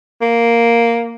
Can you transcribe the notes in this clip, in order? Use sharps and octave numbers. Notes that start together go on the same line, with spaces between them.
A#3